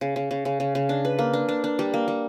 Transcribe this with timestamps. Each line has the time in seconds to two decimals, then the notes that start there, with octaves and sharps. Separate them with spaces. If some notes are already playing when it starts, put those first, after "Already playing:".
0.01 C#3
0.16 C#3
0.31 C#3
0.45 C#3
0.60 C#3
0.75 C#3
0.89 D4
1.05 B4
1.19 A#3
1.34 D4
1.49 D4
1.64 D4
1.79 G3
1.94 A#3
2.08 G3